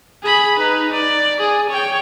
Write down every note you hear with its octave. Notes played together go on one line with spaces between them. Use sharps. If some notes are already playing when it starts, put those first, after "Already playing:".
G#4 B5
D#4 B4
D5
G#4
C#5 G5